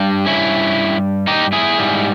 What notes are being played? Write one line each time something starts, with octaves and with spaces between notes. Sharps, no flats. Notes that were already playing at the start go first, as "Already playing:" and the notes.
Already playing: G2 G3
C#4 E4
D#4 G4
E4 G#4
G#2 G3